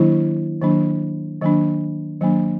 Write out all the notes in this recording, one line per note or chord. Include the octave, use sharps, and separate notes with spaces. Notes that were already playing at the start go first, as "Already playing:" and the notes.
Already playing: D#3 F#3 A#3 D4 E4
D#3 F#3 A#3 D4
D#3 F#3 A#3 D4
D#3 F#3 A#3 D4